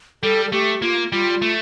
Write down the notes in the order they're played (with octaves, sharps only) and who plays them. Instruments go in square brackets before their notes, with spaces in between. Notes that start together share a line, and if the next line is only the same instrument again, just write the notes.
[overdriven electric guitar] G3 [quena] A4
[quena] A4
[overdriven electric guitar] A3 [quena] G4
[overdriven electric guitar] A#3 [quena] F4
[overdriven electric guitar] G3 [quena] F4
[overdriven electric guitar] A3